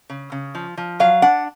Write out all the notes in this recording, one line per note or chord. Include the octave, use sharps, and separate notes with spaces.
C#3
C#3
F3
F3
F#3 F5
D4 F#5